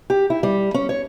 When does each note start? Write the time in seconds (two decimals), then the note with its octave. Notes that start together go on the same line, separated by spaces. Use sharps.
0.10 G4
0.30 E4
0.43 G3
0.74 C#4
0.89 C#5